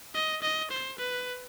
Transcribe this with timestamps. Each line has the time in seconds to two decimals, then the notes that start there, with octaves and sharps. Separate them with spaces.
0.14 D#5
0.42 D#5
0.71 C5
0.99 B4